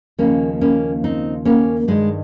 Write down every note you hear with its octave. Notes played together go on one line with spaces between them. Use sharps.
D#2 C#3 F3 A#3 C#4
A#3 C#4
C4 D#4
A#3 C#4
G2 D#3 G#3